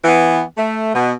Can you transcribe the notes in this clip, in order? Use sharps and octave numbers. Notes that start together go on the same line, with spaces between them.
E3 B3
A3
B2